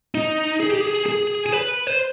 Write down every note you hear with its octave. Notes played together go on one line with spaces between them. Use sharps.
D#4
G#4
G4
G#4
G#4
G#4
B4
C5